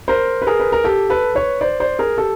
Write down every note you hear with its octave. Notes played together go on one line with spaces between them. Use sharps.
A#4 C5
B4
G#4 A#4
B4
A#4
G4 A4
A4 B4
B4 C#5
C5 D5
C5 D5
G#4 A#4
G4 A4